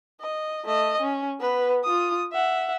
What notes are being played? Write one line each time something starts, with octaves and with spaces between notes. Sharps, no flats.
D#5
A3 D#5
C#4
B3 B4
F4 D#6
E5 F#5